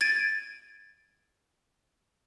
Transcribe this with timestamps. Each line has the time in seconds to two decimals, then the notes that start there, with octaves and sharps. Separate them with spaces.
0.01 G#6 A6 D7 D#7